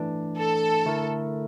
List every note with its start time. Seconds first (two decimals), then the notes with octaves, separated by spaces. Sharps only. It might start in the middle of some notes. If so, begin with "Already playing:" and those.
Already playing: E3 A3 D4
0.38 A4
0.86 D3 A3 E4 A#4